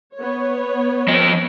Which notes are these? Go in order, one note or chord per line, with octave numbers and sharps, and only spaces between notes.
B3 C#5
F3 D#5